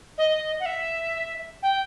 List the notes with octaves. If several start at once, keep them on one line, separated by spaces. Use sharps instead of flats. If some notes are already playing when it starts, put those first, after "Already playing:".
D#5
F#5
E5
G5